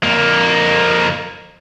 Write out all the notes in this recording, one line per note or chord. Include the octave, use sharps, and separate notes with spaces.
F2 A#3